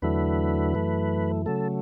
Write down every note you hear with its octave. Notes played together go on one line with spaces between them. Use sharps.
E2 D3 F#3 A3 E4 B4
F#2 E3 A3
C#3 F#3 A3 A4